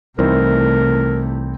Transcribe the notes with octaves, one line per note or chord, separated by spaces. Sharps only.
C2 C3 E3 A3 C4 D#4 A#4